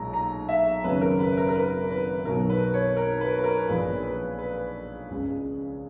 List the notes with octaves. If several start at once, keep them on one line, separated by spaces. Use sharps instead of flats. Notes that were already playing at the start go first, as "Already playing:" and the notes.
Already playing: B1 A#2 G#3 A#5
A#5
E5
G#1 F#2 C#3 F#3 B4
A#4
B4
A#4
A#4
B4
B4
B1 B2 F#3 A#4
B4
C#5
A#4
B4
B4
A#4
A#1 A#2 G#3 B4
B4
B4
C#2 C#3 G#3